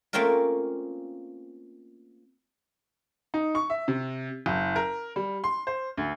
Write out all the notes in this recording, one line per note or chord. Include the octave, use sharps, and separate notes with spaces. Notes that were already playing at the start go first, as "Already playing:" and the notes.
A3 A#3 C4 C#4 F4 A#4
D#4
C#6
E5
C3
F#1
A#4
G3
C6
C5
D2